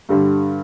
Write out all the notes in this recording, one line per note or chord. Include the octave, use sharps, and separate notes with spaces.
G2 D3 G3